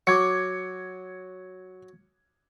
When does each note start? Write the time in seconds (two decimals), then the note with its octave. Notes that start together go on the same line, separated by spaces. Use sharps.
0.07 F#3 C#6 D6 G#6 C#7